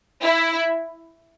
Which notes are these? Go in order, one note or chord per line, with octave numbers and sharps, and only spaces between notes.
E4